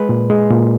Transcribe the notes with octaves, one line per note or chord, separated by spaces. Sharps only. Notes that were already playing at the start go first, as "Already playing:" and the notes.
Already playing: G#3 B4
A#2
G#3
A#2